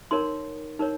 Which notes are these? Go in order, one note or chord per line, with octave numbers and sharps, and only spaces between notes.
D#4 A#4 C#5 C6
D#4 A#4 C#5